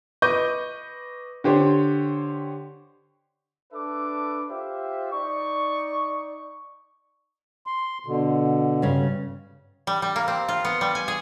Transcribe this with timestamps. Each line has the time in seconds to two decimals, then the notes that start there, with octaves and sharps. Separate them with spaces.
0.22 B4 D#5 B5 C#6 D6 G6
1.44 D3 G4 C5 C#5
3.73 D4 A4 B4 E5 D6
4.50 F4 G4 C5 E5
5.12 D#4 D5 C#6
7.67 C6
8.07 B2 D3
8.82 G2 C#3
9.87 G3
10.02 G3
10.16 A#3
10.28 C4
10.48 F4
10.65 B3
10.81 G3
10.95 G#5
11.08 G#4